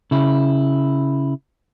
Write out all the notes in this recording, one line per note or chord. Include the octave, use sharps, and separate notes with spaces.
C#3 E4